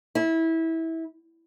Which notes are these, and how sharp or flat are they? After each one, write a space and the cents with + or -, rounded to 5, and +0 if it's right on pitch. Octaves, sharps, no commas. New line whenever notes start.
E4 -20